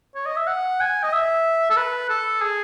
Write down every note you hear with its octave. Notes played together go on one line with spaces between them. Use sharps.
C#5
D#5
E5
F#5
G#5
D#5
E5
A4
B4
A4
G#4